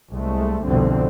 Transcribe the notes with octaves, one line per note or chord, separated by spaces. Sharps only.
C2 G#3 A3
C2 F2 B2 D3 C4